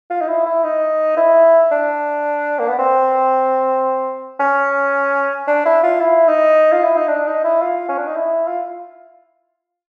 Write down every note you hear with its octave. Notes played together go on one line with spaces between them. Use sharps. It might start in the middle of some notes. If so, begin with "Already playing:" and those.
F4
D#4
E4
E4
D#4
E4
D4
A#3
B3
C4
C#4
D4
E4
F4
E4
D#4
F4
E4
D#4
D4
D#4
E4
F4
C#4
D4
D#4
E4
F4